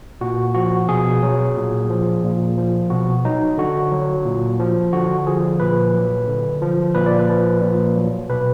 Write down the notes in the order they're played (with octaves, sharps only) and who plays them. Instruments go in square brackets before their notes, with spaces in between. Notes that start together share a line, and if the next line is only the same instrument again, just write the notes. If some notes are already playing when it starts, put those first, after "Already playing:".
[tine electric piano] A#2 F#4
F3 F#4
B2 G#4
F#3
A#2
F3
A#2
F3
B2 F#4
F#3 D#4
D3 F#4
F#3
A#2
F3
D3 F#4
F3 G#4
A#2 B4
F#3
D3
F3
A#2 B4
D5
B4
F3
A#2
F#3
B2 B4